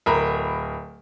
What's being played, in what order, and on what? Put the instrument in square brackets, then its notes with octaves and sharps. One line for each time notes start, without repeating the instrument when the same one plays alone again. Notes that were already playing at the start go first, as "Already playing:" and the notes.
[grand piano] D1 A#4 B5